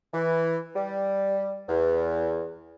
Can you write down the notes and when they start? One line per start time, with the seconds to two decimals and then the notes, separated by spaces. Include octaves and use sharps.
0.14 E3
0.75 G3
1.68 E2